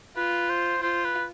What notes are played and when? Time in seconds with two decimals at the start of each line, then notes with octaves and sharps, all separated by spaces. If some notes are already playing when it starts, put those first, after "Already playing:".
0.17 F4 B4
0.50 C5
0.82 F4 C5
1.05 B4